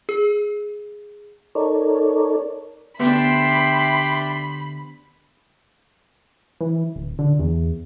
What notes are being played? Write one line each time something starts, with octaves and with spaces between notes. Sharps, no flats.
G#4
D#4 A4 A#4 C#5 D5
D2 B3 D4 G4 E5 B5 C6
E3
D1
D3
E2